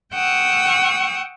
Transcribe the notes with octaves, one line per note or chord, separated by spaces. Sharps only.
F#5 G5 C#6 D#6 E6